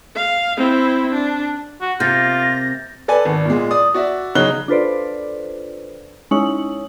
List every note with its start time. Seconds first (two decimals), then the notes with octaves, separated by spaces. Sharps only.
0.16 F5
0.58 C4 E4
1.13 D4
1.82 F#4
2.00 C3 A#3 F4 G6 A6 A#6
3.08 A4 B4 D5 G#5
3.25 G#1
3.45 A#2 G#3
3.71 D5 D#6
3.94 F#4 D5 E5
4.35 C#3 F#3 D#4 F#6 G7
4.68 D4 F4 A4 B4 C5 D5
6.31 G#3 C#4 D#4 E4 C#5 F#7